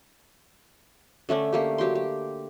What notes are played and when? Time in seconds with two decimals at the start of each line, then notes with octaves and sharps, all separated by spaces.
1.29 D3 A3 C#4 D4
1.53 A3 A#3 G4
1.78 F#3 G4 G5 C6
1.95 G4